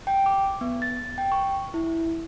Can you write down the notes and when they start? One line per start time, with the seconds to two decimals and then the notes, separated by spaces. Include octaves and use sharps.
0.07 G5
0.26 D6
0.61 B3
0.82 A6
1.18 G5
1.32 C#6
1.74 E4